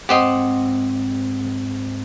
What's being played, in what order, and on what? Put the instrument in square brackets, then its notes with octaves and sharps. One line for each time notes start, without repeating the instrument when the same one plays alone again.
[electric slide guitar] G#2 C4 F#5 [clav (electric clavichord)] G4 C5 D#5